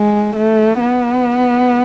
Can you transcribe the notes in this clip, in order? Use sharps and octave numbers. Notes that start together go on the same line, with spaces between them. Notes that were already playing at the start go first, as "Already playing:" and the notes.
Already playing: G#3
A3
B3